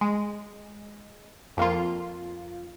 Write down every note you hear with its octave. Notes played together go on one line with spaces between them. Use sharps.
G#3
F2 A#3 F4